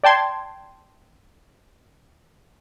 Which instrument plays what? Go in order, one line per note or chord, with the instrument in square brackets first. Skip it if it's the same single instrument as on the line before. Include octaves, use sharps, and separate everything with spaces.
[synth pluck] D5 G5 A5 C6 G#6